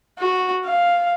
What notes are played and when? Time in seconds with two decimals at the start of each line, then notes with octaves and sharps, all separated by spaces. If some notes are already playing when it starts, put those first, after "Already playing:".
0.18 F#4
0.65 F5